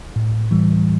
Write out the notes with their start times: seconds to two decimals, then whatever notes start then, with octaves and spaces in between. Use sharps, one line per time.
0.16 A2
0.51 E3 G3